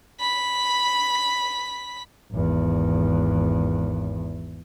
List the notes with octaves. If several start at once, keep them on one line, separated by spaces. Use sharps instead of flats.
B5 B6
G#1 E2